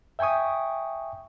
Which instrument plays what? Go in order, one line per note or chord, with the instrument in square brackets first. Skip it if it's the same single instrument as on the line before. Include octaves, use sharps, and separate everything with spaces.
[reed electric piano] E5 G5 G#5 C#6 D#6